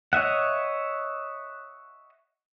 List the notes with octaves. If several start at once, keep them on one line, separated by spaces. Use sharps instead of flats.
C#5 D#5 E5 F#5